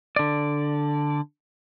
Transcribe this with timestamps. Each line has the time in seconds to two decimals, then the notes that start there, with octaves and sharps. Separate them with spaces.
0.16 D3 D5